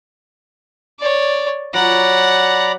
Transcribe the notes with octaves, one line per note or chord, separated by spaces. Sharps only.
C#5 D5
F#3 D5 F#5 A#5 B5